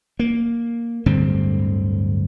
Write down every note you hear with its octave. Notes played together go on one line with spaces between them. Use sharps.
A#3
D1 G2 D3 C4